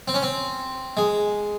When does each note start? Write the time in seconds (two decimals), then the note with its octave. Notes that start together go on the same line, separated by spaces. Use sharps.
0.08 C4
0.14 C#4
0.23 C4
0.97 G#3